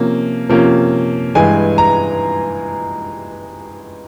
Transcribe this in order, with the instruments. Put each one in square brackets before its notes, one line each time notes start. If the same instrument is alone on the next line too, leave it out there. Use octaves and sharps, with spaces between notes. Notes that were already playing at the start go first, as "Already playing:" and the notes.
Already playing: [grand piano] C3 F3 A#3 C#4
C3 F3 A#3 C#4
G2 E3 G#3 G#5
A#5